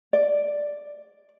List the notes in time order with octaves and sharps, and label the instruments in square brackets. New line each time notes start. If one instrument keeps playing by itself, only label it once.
[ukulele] D5